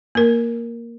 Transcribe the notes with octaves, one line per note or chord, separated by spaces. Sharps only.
A#3 A#4